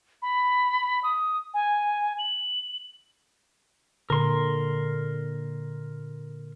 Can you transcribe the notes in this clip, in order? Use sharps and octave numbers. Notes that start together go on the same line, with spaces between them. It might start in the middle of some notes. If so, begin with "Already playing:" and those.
B5
D#6
G#5
F#7
A#2 D3 A#4 C6